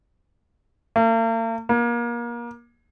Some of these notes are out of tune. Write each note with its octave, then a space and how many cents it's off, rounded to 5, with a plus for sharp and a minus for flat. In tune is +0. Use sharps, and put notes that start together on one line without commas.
A#3 -45
A#3 +30